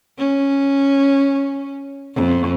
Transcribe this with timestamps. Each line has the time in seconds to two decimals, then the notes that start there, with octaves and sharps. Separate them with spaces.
0.18 C#4
2.15 F2